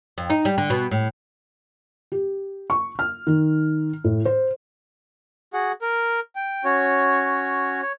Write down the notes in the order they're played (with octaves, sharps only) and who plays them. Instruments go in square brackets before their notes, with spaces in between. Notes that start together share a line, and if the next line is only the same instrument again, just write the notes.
[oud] F2
D#4
G3
D3
B2
A2
[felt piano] G4
C#6
F6
D#3
A2
C5
[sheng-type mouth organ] F#4 G#4 F#5
A#4
G5
C#4 F#4 C#5
C#5